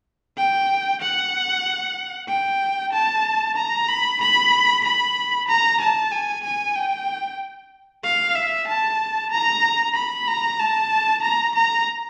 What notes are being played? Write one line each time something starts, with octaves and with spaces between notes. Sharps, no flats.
G5
F#5
G5
A5
A#5
B5
B5
B5
A#5
A5
G#5
G#5
G5
F5
E5
A5
A#5
B5
A#5
A5
A#5
A#5